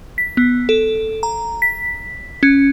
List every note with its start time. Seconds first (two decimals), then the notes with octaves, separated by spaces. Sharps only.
0.18 B6
0.37 B3
0.69 A4
1.23 A#5
1.62 B6
2.43 C#4